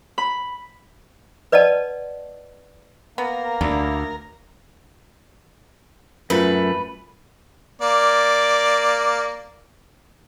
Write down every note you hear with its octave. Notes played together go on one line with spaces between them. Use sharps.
B5
B4 D5 D#5 F#5 A5
A#3 B3 A#4
D2 F#3 D4 E4
F#2 A3 F4 A#4 B4
A#3 D5